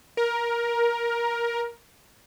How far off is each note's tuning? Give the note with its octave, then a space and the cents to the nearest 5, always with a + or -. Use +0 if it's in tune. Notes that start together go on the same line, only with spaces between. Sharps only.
A#4 +15